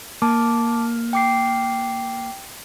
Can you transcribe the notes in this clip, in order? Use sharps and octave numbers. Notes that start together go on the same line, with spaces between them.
A#3 A5 D6
G5 D6 C7